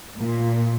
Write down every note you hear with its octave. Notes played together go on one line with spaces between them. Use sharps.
A#2